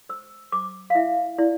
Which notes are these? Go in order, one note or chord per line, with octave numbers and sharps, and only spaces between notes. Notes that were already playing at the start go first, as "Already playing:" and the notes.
C5 E6
C5 D6
F5
E4 E5
E4 D5